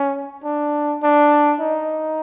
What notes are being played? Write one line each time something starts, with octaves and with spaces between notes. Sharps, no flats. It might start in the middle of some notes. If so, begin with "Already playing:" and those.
Already playing: C#4
D4
D4
D#4